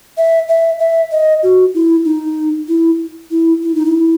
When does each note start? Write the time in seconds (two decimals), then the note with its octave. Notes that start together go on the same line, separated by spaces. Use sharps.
0.17 E5
0.49 E5
0.79 E5
1.11 D#5
1.43 F#4
1.74 E4
2.05 D#4
2.68 E4
3.31 E4
3.63 E4
3.75 D#4
3.85 E4